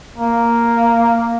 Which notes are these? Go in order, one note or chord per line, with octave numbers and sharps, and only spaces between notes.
A#3